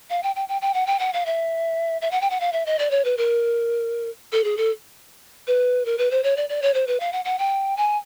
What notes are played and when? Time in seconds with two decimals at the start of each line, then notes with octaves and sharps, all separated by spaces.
0.10 F5
0.23 G5
0.36 G5
0.49 G5
0.62 G5
0.74 F#5
0.87 G5
0.99 F#5
1.13 F5
1.26 E5
2.02 E5
2.11 F#5
2.21 G5
2.30 F#5
2.40 F5
2.53 E5
2.66 D#5
2.79 D5
2.91 C#5
3.05 B4
3.17 A#4
4.32 A4
4.44 G#4
4.57 A4
5.47 B4
5.86 A#4
5.98 B4
6.11 C5
6.23 C#5
6.37 D5
6.49 D5
6.62 C#5
6.74 C5
6.87 B4
7.00 F5
7.13 F#5
7.25 F#5
7.39 G5
7.77 G#5